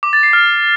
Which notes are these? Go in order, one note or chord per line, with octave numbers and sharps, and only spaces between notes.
D6
A6
C7
F6